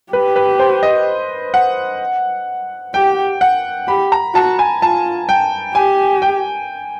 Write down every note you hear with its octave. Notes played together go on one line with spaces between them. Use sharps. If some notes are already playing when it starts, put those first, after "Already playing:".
G4 B4
B4
C5
D#5
F#5
G4 G5
F#5
G4 B5
A#5
F#4 A5
G#5
F4 A5
G5
G4 G#5
G5